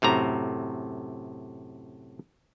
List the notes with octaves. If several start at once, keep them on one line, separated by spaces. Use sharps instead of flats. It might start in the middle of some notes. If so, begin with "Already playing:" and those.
F#2 A2 C3 A#5